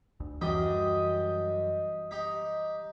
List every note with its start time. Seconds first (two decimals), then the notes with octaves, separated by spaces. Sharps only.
0.20 D2
0.41 F#2 E3 G3 G4 D#5 G5
2.11 D#4 G4